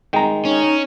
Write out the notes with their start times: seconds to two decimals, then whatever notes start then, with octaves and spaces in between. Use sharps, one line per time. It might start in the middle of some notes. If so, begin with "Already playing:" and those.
0.13 D#3 G#3 G5 A#5
0.45 C#4 D#4